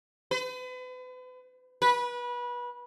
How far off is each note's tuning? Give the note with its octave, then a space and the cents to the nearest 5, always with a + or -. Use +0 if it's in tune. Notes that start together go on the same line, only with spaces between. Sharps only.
B4 +40
B4 -25